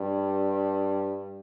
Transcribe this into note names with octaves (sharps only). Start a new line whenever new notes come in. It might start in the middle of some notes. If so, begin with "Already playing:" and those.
Already playing: G2